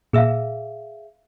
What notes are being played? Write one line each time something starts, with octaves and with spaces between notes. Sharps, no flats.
A#2 G#4 E5 F5 E6